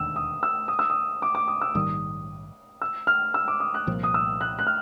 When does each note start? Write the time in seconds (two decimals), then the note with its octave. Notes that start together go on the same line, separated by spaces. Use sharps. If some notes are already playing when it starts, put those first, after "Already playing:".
Already playing: E1 D#2 D3 E6
0.16 D#6
0.43 E6
0.68 D#6
0.79 E6
0.90 D#6
1.22 D6
1.35 D6
1.48 D#6
1.61 E6
1.75 A#1 G#2 D#3 G3 D#6
2.82 E6
3.07 F6
3.34 E6
3.48 D6
3.60 D#6
3.74 F#6
3.87 C2 A#2 F3
4.03 D#6
4.14 E6
4.41 F#6
4.59 F#6
4.67 F6